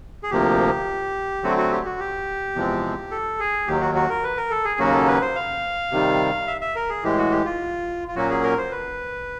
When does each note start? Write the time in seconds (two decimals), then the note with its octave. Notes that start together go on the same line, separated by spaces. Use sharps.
0.23 G#4
0.31 D2 C3 F3 A#3 G4
1.43 D3 F#3 A3 C4 F#4
1.57 F#4
1.71 G4
1.85 F#4
2.00 G4
2.56 E2 C3 F3 G#3 C4
3.11 A4
3.40 G#4
3.67 D#2 D#3 F#3 G4
3.81 F#4
3.95 F#4
4.10 A#4
4.24 B4
4.37 A#4
4.51 A4
4.65 G#4
4.79 D#2 C#3 F#3 A#3 C#4 F#4
4.93 A4
5.07 B4
5.22 C5
5.35 F5
5.92 C3 D#3 G3
6.47 E5
6.61 E5
6.75 A#4
6.90 G#4
7.03 A2 E3 G#3 G4
7.18 F#4
7.31 G4
7.45 F4
8.08 F4
8.16 A#2 F#3 A#3 C#4 F#4
8.30 G#4
8.43 A#4
8.58 C5
8.71 B4